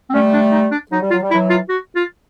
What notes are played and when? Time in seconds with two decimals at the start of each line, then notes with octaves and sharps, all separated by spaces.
0.10 C4
0.13 G3 A3 C#4
0.34 D4
0.52 D#4
0.72 D4
0.92 F#3 D#4
1.02 G3
1.10 F#3 F4
1.22 G3
1.31 E3 F#3 E4
1.50 F4
1.69 F#4
1.96 F4